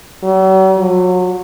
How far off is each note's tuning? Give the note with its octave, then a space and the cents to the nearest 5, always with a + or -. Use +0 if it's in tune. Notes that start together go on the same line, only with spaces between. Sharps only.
F#3 +45
F#3 -30